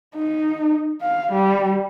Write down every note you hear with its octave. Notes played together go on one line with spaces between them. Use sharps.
D#4
F5
G3